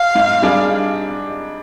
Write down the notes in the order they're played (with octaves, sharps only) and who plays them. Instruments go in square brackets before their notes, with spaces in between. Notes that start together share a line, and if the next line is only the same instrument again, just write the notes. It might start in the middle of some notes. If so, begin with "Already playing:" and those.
Already playing: [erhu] F5
[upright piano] G#2
G3 D4 G#4